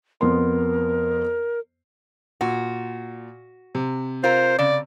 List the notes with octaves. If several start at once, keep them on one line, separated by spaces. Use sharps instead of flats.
F2 B3 A#4 C6
A#2 F#4
C3
F4 A#4 C5
C#3 D5